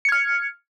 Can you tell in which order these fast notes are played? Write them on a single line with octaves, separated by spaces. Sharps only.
C#7 G#6 F6